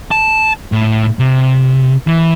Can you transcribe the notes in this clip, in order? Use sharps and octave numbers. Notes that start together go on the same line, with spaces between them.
A5
A2
C3
E3